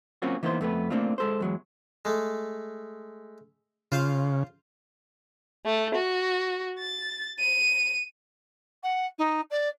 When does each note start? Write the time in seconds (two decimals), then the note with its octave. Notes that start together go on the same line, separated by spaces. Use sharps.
0.22 F#3 A#3 C4 C#4 F4 F#4
0.43 E3 A#3 B3 D#4 C5
0.61 F2 A3 B3 B4
0.90 A3 A#3 C4 D4 F4
1.18 G#3 A4 C5
1.40 E2 F#3 G#3
2.05 G#3 A3
3.92 C#3 F4 C5 F5
5.66 A3
5.95 F#4
6.79 A6
7.39 D#7
8.83 F#5
9.18 D#4
9.51 D5